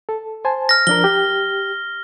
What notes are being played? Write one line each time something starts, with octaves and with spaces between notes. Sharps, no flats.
A4
C5 G#5 A5
F6 A#6
F3 D4 A#4 G7
G4